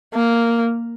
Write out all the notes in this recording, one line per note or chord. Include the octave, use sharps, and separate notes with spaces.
A#3